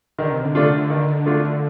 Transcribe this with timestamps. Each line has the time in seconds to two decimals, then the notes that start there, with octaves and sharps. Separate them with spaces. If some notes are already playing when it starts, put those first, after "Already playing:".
0.19 D3 D#3
0.32 C3
0.45 D3
0.55 A3 D4 F4
0.90 D#3
1.26 A3 D4 F4